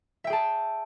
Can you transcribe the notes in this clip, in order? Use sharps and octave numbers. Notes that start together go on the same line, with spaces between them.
G#4 E5 G5 A5